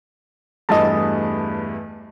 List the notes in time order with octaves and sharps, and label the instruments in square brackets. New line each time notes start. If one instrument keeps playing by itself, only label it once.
[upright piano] E2 G2 A3 [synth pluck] D#5 A5